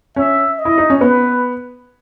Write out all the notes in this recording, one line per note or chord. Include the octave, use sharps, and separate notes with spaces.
C#4 E5
D#5
E4
D#4
C#4
B3 B4